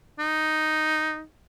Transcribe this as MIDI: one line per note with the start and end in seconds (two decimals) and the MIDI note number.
0.19 1.23 63